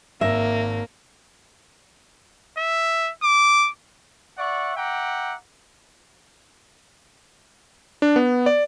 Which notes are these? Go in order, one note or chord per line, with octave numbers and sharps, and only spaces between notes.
G#1 A#3 E5 A#6
E5
D6
D5 E5 F#5 C#6
E5 F#5 G5 A#5 D6
D4
B3
D5